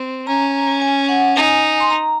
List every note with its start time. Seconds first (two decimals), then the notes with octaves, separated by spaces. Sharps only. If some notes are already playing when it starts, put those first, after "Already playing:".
Already playing: C4
0.27 C#4 A#5
0.82 G#5
1.09 F#5
1.36 D#4 G#5
1.80 C6
1.90 A#5